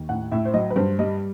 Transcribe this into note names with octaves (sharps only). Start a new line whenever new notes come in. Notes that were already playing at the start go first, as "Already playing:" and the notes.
Already playing: D#2
A2 F#5
A2 E5
C5
F#3 D#5
B4
G2 C5
G3 D#5